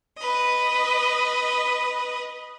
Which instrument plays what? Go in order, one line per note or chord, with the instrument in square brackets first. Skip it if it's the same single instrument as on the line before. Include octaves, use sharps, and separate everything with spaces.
[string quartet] B4 D#5